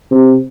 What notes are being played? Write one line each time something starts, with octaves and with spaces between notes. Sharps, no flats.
C3